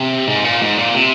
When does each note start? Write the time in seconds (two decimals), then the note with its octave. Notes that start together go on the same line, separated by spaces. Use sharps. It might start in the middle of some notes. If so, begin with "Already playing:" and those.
Already playing: C3
0.27 G#2
0.44 A#2
0.62 G#2
0.78 A#2
0.94 C3